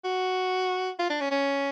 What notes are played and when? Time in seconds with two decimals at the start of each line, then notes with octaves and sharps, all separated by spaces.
0.05 F#4
0.99 F4
1.10 D4
1.21 C#4
1.31 C#4